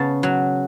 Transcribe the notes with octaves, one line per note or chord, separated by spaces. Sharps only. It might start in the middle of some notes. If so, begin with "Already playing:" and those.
Already playing: C#3 B3 A5
F#3